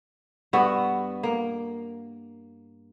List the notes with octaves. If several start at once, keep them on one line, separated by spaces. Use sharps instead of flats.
G2 B3 F#4 E5
A#3